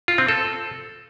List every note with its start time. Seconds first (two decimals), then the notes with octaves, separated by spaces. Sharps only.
0.08 F4
0.18 C4
0.28 A4